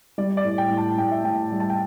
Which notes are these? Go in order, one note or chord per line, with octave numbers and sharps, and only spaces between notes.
G3 D5
D5
A2
G5
A2
A5
A2 G5
E5
A2 G5
G3
A5
G5